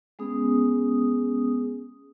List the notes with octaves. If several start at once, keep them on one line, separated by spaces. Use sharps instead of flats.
G#3 B3 C#4 G#4 D#6